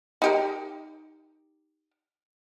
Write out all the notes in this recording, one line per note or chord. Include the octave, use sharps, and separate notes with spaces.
D#4 G4 A#4